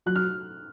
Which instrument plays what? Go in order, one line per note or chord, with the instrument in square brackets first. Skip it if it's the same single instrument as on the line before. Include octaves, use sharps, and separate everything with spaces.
[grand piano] F#3 [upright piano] F#6
[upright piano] F6